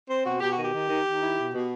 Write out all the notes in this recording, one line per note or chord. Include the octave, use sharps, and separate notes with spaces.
C4 C5
B2 F#4
B2 G4
F#4
D#3
G4
D#3
D#3
D#3
E4
B2
B2